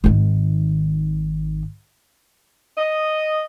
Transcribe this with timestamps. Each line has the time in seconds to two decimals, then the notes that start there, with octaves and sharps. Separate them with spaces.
0.04 G#1 D#3
2.78 D#5